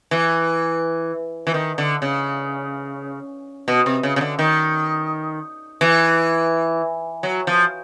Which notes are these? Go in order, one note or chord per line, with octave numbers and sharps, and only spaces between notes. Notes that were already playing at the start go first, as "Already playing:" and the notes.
E3
E3
D#3
D3
C#3
B2
C3
C#3
C#3
D3
D#3
E3
F#3
F3